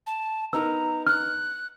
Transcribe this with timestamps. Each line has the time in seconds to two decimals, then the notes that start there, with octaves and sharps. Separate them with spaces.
0.07 A5
0.53 B3 D#4 A#4 A#5 E6
1.07 F6 F#6